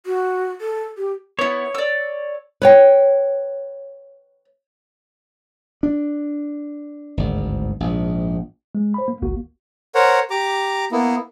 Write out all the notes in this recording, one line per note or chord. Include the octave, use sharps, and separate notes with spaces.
F#4
A4
G4
B3 E4 C#5
D5 E6
B4 C#5 G5
D4
G#1 D2 G2
A#1 G#2
G#3
C5 B5
A#3
G#1 C#2 A#3 F#4
A#4 C5 C#5 F#5
G4 A#5 D6
A#3 B3 E4